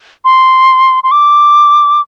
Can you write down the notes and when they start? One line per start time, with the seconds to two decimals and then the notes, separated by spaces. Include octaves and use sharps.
0.25 C6
1.04 C6
1.11 D6